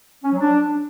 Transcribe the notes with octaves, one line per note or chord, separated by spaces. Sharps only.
C#4
F#3
D4